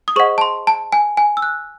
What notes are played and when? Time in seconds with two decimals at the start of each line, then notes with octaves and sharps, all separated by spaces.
0.08 D#6
0.16 G#4 C5 D#5 F#5 C#6
0.38 A5
0.41 C6
0.67 A5
0.92 G#5
1.17 G#5
1.37 E6
1.42 F#6